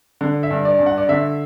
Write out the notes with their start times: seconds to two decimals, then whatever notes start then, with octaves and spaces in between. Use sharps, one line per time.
0.21 D3
0.43 E5
0.50 G2
0.65 D5
0.79 G2
0.86 F#5
0.98 D5
1.09 D3 E5